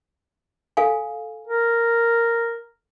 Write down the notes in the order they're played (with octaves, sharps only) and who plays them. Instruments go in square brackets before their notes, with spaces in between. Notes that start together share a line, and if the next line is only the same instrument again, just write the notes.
[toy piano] A4 F5 G#5
[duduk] A#4